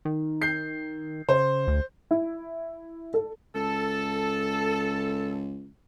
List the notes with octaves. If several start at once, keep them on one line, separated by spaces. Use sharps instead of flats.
D#3
G6 C7
C#3 C5
D2
E4
A4
C#2 A4